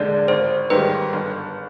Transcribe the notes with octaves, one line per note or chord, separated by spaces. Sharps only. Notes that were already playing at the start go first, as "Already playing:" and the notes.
Already playing: F1 D#2 D3 G#3 D5
G#1 C5
G#2 D#3 G3 B4
G1